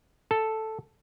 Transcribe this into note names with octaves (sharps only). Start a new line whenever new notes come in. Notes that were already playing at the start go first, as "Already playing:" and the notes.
A4